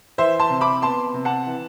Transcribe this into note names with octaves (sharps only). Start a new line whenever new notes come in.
E3 C5 E5
A5 C6
C3
B5 D6
B3 A5 C6
C3
F#5 A5
E3